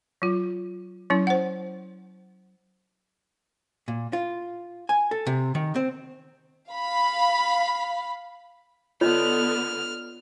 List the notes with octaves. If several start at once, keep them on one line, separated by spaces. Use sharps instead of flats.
F#3 F4
F#3 C#4 E4
C5 F#5
A#2
F4
G#5
A4
C3
D#3
C4
F5 B5
D3 B3 F4 C#5 D#5 F6